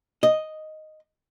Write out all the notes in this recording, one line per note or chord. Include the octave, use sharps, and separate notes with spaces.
D#5